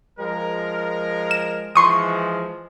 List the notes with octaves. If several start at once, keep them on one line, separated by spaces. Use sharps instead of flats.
F3 G#3 A#4
E7
E3 F3 G#3 C6 C#6 D#6